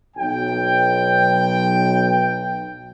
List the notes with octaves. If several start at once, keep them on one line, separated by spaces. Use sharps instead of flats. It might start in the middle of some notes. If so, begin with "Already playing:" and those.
B1 G5